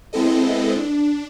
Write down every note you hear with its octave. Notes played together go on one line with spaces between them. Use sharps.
G#3 B3 C4 E4 A4 D#5
D4